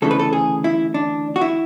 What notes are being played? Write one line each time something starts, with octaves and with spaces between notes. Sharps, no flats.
D2 C#3 E3 A3 A4
B4
A4
G#4
E4
D4
F#4
E4